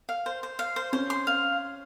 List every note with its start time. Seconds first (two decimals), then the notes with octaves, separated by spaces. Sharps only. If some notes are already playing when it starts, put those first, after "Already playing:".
0.09 F5
0.26 C5
0.43 C5
0.59 F5
0.76 C5
0.93 C#4 C5
1.10 C6
1.27 F5